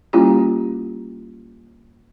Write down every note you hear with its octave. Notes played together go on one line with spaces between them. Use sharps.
G3 A#3 C#4 E4 F4 G4